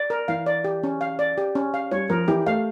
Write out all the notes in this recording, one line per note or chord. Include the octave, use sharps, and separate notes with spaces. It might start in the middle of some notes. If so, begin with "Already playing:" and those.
Already playing: D5
A#4
E3 F5
D5
G4
C#4
F5
D5
G4
C#4
F5
G3 C#5
F3 A#4
E3 G4
A3 F5